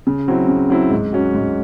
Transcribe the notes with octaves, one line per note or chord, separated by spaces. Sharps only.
C#3
F#3 C4 E4
C#3
F#3 C4 E4
G#2
F#3 C#4 F#4
G#2